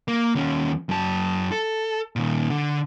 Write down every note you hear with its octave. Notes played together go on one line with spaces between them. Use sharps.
A#3
D#2 C#4
F#2 A5
A4
A#2 D#3
D3